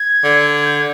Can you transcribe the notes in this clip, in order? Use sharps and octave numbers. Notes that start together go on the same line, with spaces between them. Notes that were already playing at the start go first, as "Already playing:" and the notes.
Already playing: G#6
D3
G#6
G6
G#6